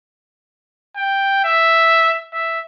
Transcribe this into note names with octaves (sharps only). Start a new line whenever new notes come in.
G5
E5
E5